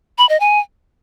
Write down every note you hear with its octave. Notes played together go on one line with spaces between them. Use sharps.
B5
D#5
G#5